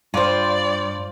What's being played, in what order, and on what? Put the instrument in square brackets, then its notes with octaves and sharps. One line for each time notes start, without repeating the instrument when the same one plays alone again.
[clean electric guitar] G2 [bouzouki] F4 C5 [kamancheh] D5